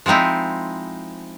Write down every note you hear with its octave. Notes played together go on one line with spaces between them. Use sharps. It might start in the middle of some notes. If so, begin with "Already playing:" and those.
F3 G#3 C4 D#4 E4